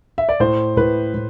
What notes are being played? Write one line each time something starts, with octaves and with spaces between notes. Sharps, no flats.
E5
D5
A2 C5
A2 B4
A2